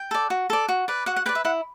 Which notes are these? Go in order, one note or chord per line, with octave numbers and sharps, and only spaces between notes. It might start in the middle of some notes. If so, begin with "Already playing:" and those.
Already playing: G5
A4 D5
F#4
A4 D5
F#4
B4 D5
F#4 F#5
F#5
B4 D5 G5
E5
E4 F#5